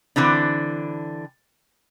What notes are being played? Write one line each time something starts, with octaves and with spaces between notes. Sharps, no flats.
D3 E3 C4 D4